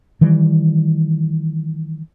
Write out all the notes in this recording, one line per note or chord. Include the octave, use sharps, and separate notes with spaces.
D#3 E3 G3